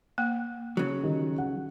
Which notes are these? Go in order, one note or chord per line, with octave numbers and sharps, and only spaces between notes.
A#3 G5
C#3 F#3
D#3 G3
F#5